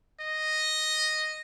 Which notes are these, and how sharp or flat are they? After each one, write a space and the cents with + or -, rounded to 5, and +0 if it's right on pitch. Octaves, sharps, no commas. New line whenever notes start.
D#5 -5